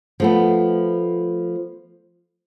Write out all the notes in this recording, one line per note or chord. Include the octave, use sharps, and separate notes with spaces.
F3 A3 B3